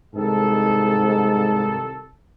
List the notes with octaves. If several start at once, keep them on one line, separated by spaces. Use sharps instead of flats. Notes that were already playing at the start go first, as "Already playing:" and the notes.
C2 G#2 D#3 A4